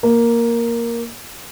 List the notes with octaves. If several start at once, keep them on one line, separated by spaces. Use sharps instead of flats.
A#3